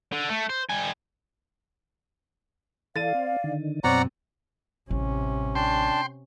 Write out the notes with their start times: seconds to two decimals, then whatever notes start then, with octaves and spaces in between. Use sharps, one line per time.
0.13 D3
0.29 A3
0.50 C5
0.69 G3 G#5
2.96 E3 A4 D5 F5 A6 D#7
3.14 C4
3.44 D3 D#3
3.84 F#2 B2 C4 C#5 D5 F#5 A#5 C#6
4.90 A1 C3 G3 C#4
5.55 D4 G5 A5 C6